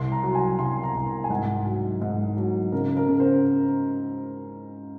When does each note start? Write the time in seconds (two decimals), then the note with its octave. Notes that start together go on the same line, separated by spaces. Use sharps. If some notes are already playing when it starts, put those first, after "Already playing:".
Already playing: C2 C6
0.12 A#5
0.23 F#3
0.35 G#5
0.59 C2 C6
0.83 A#5
0.95 C2
1.24 G#5
1.30 G#2 F#5
1.66 F#3
2.01 G#2
2.37 F#3
2.72 C#3 A#4
2.97 A#4
3.08 C#3
3.20 C5